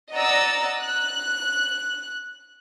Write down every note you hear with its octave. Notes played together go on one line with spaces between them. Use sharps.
D5 D#5 F#5 A#5 E6 A6
F#6